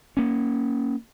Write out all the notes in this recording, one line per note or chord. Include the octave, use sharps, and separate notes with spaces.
A#3 C#4